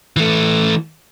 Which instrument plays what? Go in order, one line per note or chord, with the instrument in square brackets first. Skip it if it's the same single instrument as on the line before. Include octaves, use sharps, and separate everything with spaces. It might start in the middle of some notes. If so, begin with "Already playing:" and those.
[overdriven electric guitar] E3 A3